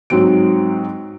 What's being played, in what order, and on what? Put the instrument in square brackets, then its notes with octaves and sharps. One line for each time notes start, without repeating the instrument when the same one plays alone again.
[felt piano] G#2 F#3 C4 F#4 D7